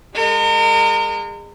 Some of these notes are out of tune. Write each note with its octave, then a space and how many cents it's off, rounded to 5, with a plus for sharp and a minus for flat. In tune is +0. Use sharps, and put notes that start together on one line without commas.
G#3 -30 A#4 -35